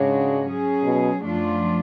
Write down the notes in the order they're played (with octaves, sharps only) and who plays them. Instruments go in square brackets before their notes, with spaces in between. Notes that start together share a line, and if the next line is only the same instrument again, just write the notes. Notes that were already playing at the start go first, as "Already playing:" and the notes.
Already playing: [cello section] G#2 G#3 D4 F#4 C#5 [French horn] C#3
[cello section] F#3 C#4 G#4
[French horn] B2
[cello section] F#2 F3 A3 D4 F4